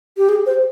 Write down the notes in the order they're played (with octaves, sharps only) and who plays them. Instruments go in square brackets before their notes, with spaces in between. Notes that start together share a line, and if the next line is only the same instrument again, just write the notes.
[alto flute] G4
G#4
C5